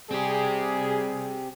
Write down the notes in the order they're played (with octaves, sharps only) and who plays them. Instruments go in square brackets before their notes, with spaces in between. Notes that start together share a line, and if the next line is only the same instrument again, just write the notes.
[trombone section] G3 G#4 [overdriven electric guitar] C4 G4